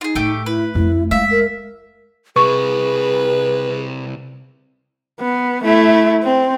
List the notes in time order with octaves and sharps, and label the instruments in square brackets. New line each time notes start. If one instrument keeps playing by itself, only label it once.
[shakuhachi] D#4 [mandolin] F4 G#4
[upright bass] A2 [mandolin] A3 G4 D6
[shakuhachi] E4 [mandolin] B4
[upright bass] F2 A3 [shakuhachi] E4
[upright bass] G#3 [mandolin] E5 [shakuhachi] F5
[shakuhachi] A#4
[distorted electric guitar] C3 E4 [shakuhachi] G#4 [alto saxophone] B4 [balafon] C#6
[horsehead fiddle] B3
A3 E4
C4